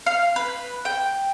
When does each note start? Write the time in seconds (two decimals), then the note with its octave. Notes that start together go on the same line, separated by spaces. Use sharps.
0.06 F5
0.36 B4
0.85 G5